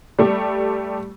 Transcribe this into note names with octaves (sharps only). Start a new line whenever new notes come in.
G3 A3 G4